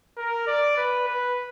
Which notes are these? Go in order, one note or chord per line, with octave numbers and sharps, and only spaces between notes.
A#4
D5
B4
B4